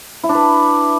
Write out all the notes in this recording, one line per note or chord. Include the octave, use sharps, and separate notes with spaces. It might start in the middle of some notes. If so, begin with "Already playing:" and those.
E4
D4
B4